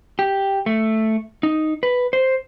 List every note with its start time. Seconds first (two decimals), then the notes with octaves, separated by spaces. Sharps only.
0.19 G4
0.66 A3
1.43 D#4
1.83 B4
2.13 C5